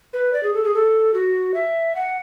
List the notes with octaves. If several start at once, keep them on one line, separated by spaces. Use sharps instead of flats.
B4
D5
G#4
A4
G#4
A4
F#4
E5
F#5